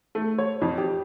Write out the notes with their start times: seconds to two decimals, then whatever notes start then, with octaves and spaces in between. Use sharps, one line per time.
0.15 A3
0.38 C#5
0.62 F2
0.78 G4